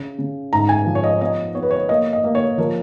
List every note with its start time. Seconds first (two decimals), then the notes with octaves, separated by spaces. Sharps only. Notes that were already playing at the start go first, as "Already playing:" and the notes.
Already playing: C#3
0.18 C#3
0.53 G#2 A#5
0.69 G#5
0.86 F3
0.95 C#5
1.04 D#5
1.21 B3 D#5
1.55 B3 C#5
1.63 B4
1.70 C#5
1.89 A#3 D#5
2.13 D#5
2.24 A#3
2.35 C#5
2.58 F3 A#4